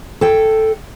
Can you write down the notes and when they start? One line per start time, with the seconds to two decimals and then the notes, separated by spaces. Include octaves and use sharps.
0.21 A4 G5